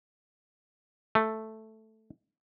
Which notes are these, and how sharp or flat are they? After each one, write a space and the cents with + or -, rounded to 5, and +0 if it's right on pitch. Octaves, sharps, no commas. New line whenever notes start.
A3 +0